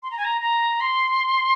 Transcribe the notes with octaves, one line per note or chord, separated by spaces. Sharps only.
C6
A#5
G#5
A#5
A#5
C6